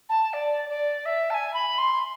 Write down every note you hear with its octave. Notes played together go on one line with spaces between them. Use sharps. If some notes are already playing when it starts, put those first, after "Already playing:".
A5
D5
D5
E5
A5
G#5
B5
C6